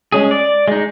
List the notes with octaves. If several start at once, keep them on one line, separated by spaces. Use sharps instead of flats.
G#3 C#4 G#4
D5
G#3 D#4